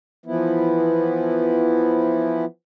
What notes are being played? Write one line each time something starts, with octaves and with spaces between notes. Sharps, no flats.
E3 F3 B3 E4